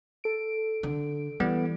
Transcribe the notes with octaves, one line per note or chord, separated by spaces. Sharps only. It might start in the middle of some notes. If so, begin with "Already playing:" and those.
A4 D7
D3
E3 G3 B3